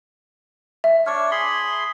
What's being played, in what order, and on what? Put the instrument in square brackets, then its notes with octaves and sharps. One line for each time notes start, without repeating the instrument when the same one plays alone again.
[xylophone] E5
[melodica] D4 C#5 [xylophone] C#6 F6
[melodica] G#4 B5 C6